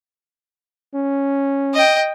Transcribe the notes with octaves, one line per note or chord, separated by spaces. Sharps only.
C#4
D#5 G5